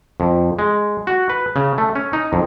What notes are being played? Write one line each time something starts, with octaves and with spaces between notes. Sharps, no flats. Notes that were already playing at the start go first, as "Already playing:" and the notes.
F2
G#3
F#4
B4
C#3
A3
C#4
D#4
F2